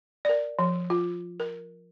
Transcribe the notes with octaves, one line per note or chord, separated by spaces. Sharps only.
A#4 D5
F3
F4
A#4